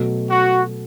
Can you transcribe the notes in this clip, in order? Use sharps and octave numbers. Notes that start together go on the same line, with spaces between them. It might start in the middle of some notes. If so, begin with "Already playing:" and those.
Already playing: B2 F#3 A3
F#4